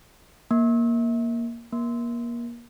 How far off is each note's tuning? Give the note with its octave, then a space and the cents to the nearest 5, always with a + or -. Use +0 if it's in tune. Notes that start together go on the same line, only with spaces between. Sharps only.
A#3 +10
A#3 +30